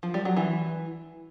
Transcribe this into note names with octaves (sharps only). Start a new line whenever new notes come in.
F3
G3
F#3
E3